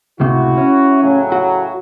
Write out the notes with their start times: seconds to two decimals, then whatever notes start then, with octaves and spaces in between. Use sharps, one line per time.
0.20 C#2 A2 C3 E4 F#4
0.57 C#4
1.03 A2 C#3 F#3
1.32 F#4